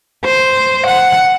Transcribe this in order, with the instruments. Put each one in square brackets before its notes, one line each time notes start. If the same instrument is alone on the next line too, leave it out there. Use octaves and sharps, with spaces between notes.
[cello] C5
F#5